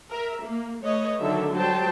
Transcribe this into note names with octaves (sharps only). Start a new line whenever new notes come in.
A#4 E5
A#3
A3 B4 C#5 D#5
D3 D#3 F#3 D4 A4 E5
F#3 G3 C5 G5 A5